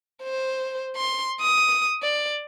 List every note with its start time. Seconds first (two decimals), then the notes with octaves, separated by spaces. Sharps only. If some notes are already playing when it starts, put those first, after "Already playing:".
0.23 C5
0.97 C6
1.41 D#6
2.03 D5